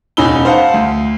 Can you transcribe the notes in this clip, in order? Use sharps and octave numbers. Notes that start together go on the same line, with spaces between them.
E1 C#4 D#4 B5 E6 G7
C5 F5 F#5 A5
D2